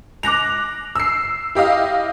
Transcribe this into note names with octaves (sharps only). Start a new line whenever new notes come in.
D6 F#6 A#6 F7
E6 C7
E4 G4 D#5 F5